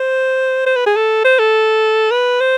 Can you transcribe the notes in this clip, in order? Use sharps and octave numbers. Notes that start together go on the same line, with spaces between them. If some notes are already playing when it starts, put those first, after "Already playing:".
Already playing: C5
C5
B4
G#4
A4
C5
A4
B4
C5